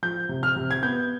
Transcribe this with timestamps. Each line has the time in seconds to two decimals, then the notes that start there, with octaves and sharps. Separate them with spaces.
0.03 F3 G6
0.29 C3
0.43 F6
0.56 C3
0.71 G#6
0.83 B3 G6